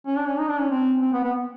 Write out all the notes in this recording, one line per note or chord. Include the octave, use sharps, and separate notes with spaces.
C#4
D4
C#4
D#4
D4
C#4
C4
C4
B3
B3